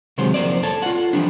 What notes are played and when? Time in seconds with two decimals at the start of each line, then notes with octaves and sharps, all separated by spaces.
0.18 C3 D#3 F#3 G#3 C5
0.34 F2 A#3 C5 D5
0.63 A4 C#5 A5
0.82 F4 F#5
1.13 E3 F3 G3 D4